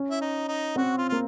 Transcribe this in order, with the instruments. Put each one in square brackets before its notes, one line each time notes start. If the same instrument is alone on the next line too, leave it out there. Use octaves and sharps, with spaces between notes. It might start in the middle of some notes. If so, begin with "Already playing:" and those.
Already playing: [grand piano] C#4
[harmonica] E4
D#4
D#4
[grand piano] C4 [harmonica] F#4
[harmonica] F4
[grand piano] A#3 [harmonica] F4